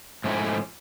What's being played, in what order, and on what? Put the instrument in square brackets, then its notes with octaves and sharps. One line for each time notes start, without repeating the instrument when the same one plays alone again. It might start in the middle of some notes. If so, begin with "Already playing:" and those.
[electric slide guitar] G#2 F3 A3 C#4 E4